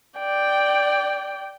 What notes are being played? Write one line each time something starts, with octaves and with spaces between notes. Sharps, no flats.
D5 G5